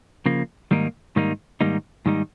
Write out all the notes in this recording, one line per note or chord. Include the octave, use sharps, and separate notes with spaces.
C#3 F3 A#3
G#2 D#3 G3 A#3 D#4
G#2 D#3 G3 A#3 D#4
G#2 D#3 G3 A#3 D#4
G#2 D#3 G3 A#3 D#4